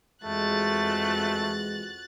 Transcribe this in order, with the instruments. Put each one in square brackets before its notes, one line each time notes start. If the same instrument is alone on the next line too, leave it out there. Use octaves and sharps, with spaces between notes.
[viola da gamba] F2 F#4 [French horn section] E3 G#3 [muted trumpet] A3 [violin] F#6 A6